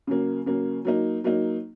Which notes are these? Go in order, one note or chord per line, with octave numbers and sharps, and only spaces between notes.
C#3 F#3 A#3
C#3 F#3 A#3
F#3 A#3 D#4
F#3 A#3 D#4